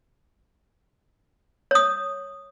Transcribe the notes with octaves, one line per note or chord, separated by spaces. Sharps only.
C#5 D#6